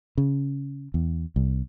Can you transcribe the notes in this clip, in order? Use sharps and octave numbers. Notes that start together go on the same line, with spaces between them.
C#3
E2
C2